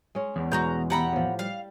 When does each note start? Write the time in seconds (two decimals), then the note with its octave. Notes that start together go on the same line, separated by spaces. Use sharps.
0.15 G#3 C#4
0.36 E2
0.52 B2 G#3 F#4 B4 A#5 G6
0.90 G4 D5 E5 F#5 A#5 B5
1.13 A2 F3
1.39 G3 F5